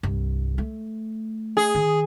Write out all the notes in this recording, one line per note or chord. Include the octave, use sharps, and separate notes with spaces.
C2 G2
A3
G#4
D#3